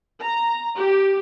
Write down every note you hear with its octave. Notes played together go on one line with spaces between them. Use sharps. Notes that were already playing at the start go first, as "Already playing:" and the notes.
A#5
G4